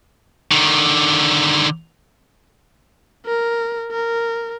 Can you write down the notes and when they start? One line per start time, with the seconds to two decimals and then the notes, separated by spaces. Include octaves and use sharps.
0.51 D3 D#3
3.26 A#4
3.92 A#4